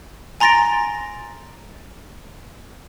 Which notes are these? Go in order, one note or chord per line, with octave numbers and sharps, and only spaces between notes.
G#5 A#5 C6 A6 A#6 D7